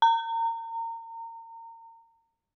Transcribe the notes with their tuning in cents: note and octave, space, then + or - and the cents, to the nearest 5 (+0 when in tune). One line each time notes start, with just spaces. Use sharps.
A#5 -30